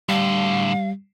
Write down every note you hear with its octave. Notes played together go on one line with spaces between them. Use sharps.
A2 D3 G3 F5